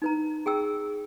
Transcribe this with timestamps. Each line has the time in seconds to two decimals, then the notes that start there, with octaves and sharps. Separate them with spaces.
0.02 D#4 B4 A#5
0.46 G#4 G5 E6